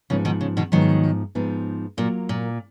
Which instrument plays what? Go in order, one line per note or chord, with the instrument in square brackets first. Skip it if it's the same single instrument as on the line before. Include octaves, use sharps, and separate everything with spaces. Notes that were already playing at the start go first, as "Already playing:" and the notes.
[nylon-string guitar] G#2 F3 B3 D#4 [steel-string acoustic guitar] C#3
[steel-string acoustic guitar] B2 D#3
C#3
B2 D#3
[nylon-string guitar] G#2 F3 B3 D#4 [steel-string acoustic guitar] D#3 F#3
[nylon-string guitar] G#2 F3 B3 D#4
[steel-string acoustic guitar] A#2 [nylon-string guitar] F#3 A#3 F4 A#4
[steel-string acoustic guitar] A#2